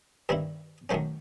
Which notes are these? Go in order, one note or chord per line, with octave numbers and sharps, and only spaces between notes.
G2 D#3 G3 C4 E4
F#2 D#3 F#3 A3 C#4 C5